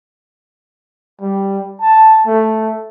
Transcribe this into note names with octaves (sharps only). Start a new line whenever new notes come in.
G3
A5
A3